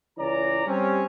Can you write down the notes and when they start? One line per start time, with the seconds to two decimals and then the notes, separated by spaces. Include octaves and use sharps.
0.18 C#2 E3 C#4 D5 A#5
0.66 G3 C4 C#4